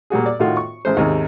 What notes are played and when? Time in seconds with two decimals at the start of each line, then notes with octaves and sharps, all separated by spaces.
0.10 A#2 G3 F#4 G#4
0.26 D5
0.40 A2 D#3 F4 F#4
0.57 C#6
0.85 A1 G#3 C5
0.97 D#2 G#2 C3